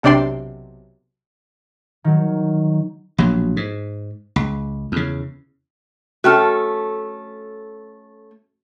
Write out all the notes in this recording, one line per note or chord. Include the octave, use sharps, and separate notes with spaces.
B1 C3 D4 D5 G5 C6
D#3 F#3
A#1 B2 F#3
G#2
C#2
E2 C#3
A3 C#4 F#4 A4 G5 F6